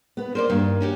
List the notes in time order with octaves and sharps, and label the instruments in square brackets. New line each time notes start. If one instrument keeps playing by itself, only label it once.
[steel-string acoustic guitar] B3 B4
[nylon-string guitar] A#3 C#4 C5 [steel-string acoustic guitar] A#4 D5
[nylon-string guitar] G2 [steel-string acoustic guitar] D#3 A#3
[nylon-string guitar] C#4 F#4 G4